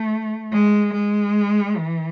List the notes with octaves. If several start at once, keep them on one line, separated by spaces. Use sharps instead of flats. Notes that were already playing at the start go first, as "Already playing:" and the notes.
Already playing: A3
G#3
G#3
E3